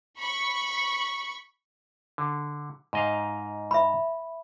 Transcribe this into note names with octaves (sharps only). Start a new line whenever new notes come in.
B5 C#6
D3
G#2 D#5 F5
E5 B5